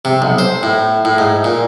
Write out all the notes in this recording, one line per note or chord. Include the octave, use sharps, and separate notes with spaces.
C3
B1
C5
A2
A2
G#2
A#2